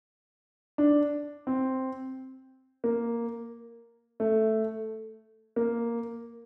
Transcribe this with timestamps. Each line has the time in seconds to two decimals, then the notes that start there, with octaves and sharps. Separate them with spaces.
0.78 D4
1.47 C4
2.84 A#3
4.20 A3
5.56 A#3